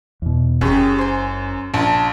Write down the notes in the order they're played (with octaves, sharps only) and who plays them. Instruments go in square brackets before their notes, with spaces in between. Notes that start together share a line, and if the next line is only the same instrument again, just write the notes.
[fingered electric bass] E2 B2
[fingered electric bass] F#1 [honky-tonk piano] F#2 [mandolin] C#4 G4 G#4
[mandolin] C5 G#5
[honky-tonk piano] A#1 [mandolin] A5 A#5 C6